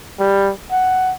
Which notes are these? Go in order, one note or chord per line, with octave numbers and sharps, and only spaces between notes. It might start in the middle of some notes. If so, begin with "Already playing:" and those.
G3
F#5